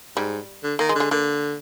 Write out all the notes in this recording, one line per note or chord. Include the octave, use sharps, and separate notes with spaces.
G#2 G3
D3
D#3 A#3
G#3
D3
G#3
D3 A#3